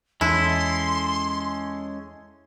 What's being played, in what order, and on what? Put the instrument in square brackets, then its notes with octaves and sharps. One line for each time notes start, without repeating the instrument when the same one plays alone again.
[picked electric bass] E2 [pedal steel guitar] G#3 C#4 A4 [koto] E4 [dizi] C6